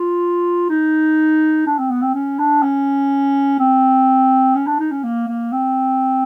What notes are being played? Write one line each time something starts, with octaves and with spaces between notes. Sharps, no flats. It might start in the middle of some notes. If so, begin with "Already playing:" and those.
Already playing: F4
D#4
D4
C4
B3
C4
C#4
D4
C#4
C4
C#4
D4
D#4
C#4
A#3
A#3
C4